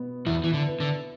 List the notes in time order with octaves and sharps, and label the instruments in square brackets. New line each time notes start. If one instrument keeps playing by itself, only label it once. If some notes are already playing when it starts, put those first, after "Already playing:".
Already playing: [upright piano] B2 B3
[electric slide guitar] E2 E3 [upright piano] E4
[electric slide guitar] E3
D3
[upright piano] B4
[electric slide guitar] D3